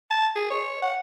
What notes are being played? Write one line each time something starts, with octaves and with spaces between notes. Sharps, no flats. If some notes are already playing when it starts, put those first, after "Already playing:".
A5
G#4
C#5
F#5